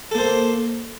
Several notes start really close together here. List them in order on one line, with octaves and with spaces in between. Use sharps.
A4 A#3 C5